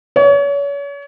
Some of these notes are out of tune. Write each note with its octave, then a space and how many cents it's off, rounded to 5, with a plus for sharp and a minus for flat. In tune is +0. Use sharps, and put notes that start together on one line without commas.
C#5 +35